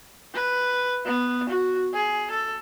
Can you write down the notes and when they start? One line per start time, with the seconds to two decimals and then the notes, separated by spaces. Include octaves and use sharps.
0.34 B4
1.06 B3
1.49 F#4
1.94 G#4
2.31 A4